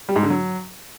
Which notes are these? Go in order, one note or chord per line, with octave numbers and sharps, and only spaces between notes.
G3
G#2
D3
F#3